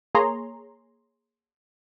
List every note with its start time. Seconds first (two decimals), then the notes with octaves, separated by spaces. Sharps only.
0.15 A#3 G#4 C#5 A#5 C6